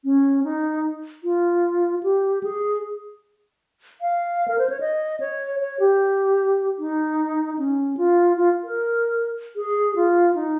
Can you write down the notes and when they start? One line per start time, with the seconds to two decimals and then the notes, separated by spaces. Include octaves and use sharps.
0.05 C#4
0.44 D#4
1.24 F4
2.03 G4
2.43 G#4
4.01 F5
4.48 A#4
4.58 C5
4.70 C#5
4.80 D#5
5.20 C#5
5.60 C#5
5.80 G4
6.79 D#4
7.59 C#4
7.97 F4
8.37 F4
8.64 A#4
9.56 G#4
9.96 F4
10.35 D#4